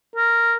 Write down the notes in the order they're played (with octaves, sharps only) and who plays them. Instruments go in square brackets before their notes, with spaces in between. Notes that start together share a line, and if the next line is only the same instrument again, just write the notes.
[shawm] A#4